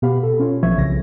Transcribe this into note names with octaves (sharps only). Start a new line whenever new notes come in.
B2 B3 G4 F5 B5
A4
C#4 F4 C#5
A#1 E3 F3 E5 C#6 G#6
C2 C#3 A#6